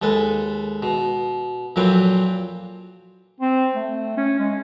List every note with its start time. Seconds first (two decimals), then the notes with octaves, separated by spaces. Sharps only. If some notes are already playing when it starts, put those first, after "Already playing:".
0.02 D#2 G#3 A4 B4
0.83 B2
1.76 F2 A#2 F#3 C4 B4 G5
3.40 C4
3.75 A3
4.17 C#4
4.39 G#3